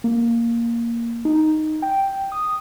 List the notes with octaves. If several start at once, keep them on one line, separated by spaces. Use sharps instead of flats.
A#3
D#4
G5
D#6